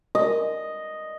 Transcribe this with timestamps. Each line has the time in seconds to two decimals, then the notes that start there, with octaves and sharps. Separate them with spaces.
0.15 D#5